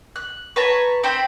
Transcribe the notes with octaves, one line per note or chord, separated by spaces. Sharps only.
F#6
B4 C#5 A5 A#5
C4 C5 G5 B5